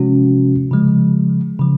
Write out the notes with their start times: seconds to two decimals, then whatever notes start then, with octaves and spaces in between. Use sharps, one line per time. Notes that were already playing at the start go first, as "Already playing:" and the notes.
Already playing: C3 F3 G#3 C#4 F#4
0.71 C#3 F3 G#3
1.59 C#3 F3